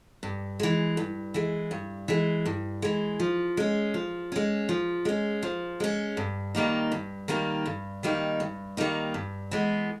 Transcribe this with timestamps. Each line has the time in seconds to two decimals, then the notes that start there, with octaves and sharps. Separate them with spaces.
0.23 G2
0.59 E3 G#3
0.97 G2
1.34 E3 G#3
1.71 G2
2.08 E3 G#3
2.45 G2
2.82 E3 G#3
3.20 F3
3.57 G#3 C#4
3.94 F3
4.32 G#3 C#4
4.69 F3
5.05 G#3 C#4
5.43 F3
5.80 G#3 C#4
6.17 G2
6.55 D#3 G3 A#3 D#4
6.92 G2
7.28 D#3 G3 A#3 D#4
7.66 G2
8.03 D#3 G3 A#3 D#4
8.40 G2
8.77 D#3 G3 A#3 D#4
9.14 G2
9.51 E3 G#3 B3